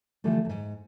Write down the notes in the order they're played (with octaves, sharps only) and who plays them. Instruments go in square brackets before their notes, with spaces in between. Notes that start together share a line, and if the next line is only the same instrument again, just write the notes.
[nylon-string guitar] D3 E3 F3 G3 A3
E2 G#2